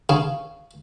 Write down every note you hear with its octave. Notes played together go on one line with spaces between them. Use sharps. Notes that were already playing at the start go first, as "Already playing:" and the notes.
C#3